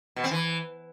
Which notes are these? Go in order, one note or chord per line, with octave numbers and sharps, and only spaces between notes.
B2
C4
E3